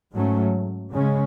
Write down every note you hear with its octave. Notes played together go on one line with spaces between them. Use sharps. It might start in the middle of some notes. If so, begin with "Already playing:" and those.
G#2 F#3 A3 C#4
C#3 G#3 C#4